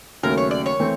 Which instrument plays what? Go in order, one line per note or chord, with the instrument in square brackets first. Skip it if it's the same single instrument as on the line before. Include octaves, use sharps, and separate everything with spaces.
[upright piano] D#2 C#3 F#3 A3 [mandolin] A#4
[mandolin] C#5
D5
C#5
[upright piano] E3 A3 C4